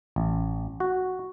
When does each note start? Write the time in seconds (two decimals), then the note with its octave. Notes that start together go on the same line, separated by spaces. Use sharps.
0.16 A1
0.80 F#4